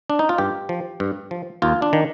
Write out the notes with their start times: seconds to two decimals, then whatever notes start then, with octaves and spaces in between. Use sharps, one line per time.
0.10 D4
0.19 D#4
0.29 F4
0.38 G2 G4
0.69 F3
1.00 G2
1.31 F3
1.62 D#2 F4
1.82 D4
1.93 D#3